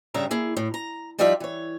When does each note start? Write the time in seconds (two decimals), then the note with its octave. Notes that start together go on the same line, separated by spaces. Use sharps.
0.14 G2 C#3 G3 E5 A#5
0.31 A#3 E4 G#4
0.57 A2
0.74 A#5
1.19 F3 G3 D#4 F4 D5 E5
1.40 E3 C#5